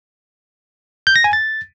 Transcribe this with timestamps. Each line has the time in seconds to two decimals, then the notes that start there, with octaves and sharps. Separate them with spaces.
1.07 G6
1.16 A#6
1.24 G#5
1.33 A6